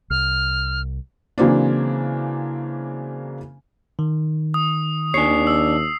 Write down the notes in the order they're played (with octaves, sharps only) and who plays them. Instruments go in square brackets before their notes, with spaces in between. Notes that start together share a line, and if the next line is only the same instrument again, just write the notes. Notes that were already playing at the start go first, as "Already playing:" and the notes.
[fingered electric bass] C2 [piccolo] F6
[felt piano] C#3 E3 F#3 A#3 C4 D4
[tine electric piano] D#3
[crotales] D#6
[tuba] D#2 [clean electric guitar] D4 C#5 [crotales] C7
[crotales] E6